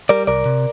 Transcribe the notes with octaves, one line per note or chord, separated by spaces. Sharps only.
G3 A#4 D5
C2 A#4 D5
C3